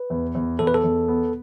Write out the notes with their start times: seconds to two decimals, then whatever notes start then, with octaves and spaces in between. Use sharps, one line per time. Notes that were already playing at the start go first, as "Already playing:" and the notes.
Already playing: B4
0.10 E2
0.35 E2
0.59 E2 A4
0.67 B4
0.74 A4
0.84 E2
1.08 B3